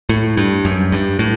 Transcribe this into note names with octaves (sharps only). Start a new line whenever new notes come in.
A2
G2
F#2
G2
A2